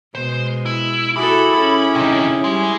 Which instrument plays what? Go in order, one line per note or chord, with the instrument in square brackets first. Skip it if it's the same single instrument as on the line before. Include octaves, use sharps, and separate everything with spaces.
[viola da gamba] B2 G#3 [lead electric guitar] C5
[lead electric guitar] E4
[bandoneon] E4 G#4 D6 [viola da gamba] F#4 A4 [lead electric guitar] B5
[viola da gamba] C#4
[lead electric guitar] C3 D#4
[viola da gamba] G3 [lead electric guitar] G#3